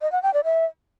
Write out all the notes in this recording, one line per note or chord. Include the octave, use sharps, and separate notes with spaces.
D#5
F#5
G5
D5
E5